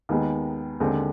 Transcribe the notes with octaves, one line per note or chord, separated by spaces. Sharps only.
D#2 D#3 G#3 B3
D#2 D3 G#3 C4